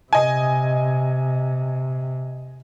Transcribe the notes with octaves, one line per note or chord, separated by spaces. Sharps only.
C3 D#5 G#5